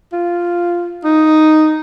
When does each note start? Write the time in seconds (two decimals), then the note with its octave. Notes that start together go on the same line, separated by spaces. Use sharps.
0.13 F4
1.04 D#4